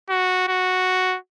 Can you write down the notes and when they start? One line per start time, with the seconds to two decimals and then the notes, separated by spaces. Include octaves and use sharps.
0.10 F#4
0.48 F#4